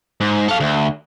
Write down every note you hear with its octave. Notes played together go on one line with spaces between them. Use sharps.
G#2
A4 F5
D2